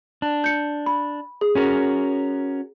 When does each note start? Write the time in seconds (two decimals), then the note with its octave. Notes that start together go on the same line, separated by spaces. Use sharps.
0.22 D4
0.44 G6 C#7
0.86 B5
1.41 G#4
1.55 C#4 F#4 A#4